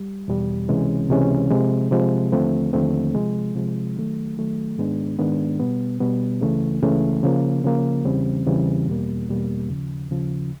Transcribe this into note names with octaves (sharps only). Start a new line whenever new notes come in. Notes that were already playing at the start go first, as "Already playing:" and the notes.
Already playing: G3
E2 B2 G3
C#2 C3 E3 G#3 C#4
C#2 C3 E3 G#3 C#4
C3 F3 G#3
C3 F3 G#3
D#2 D3 F3 A3 C4
D#2 D3 F3 A3 C4
C3 F3 G#3
C3 F3 G#3
D#3 F#3 A3
D#3 F#3 A3
G#2 D#3 G#3 B3 D4
G#2 D#3 G#3 B3 D4
B2 G3 B3
B2 G3 B3
C#2 C#3 E3 A3
C#2 C#3 E3 A3
C#3 F3 A#3
C#3 F3 A#3
E2 C#3 E3 G3 C4
E2 C#3 E3 G3 C4
E2 B2 G3 A#3
E2 B2 G3 A#3
D#2 C#3 F3
D#2 C#3 F3